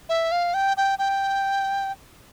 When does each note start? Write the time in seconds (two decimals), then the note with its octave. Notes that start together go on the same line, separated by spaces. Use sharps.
0.09 E5
0.32 F5
0.54 G5
0.77 G5
0.99 G5